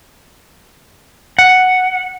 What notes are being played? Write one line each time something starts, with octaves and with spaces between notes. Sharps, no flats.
F#5